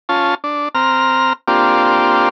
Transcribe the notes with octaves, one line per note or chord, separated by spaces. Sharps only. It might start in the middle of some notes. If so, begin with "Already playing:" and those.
C#4 F4 A5
D4
C4 A#5 F6
A#3 C4 D4 F4 G4